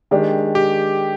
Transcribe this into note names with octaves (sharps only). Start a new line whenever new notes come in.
D#3 G#3 D4 G4
G4